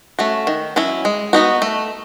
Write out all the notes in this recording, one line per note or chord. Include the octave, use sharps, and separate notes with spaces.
A3 C#4 F#4
D#3
F#3 C#4 E4
G#3
B3 D#4 F#4
A3